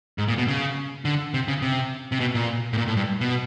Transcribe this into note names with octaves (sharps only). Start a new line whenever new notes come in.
G#2
A#2
B2
C#3
D3
C3
C#3
C3
C3
B2
A#2
A2
A#2
A2
G2
B2